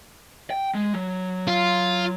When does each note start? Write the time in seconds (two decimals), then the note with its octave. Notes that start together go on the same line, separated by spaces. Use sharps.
0.51 G5
0.75 G#3
0.93 F#3
1.48 F4